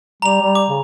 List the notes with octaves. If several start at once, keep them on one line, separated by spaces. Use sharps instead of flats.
G3 A#5 F7
G3
D6
C#3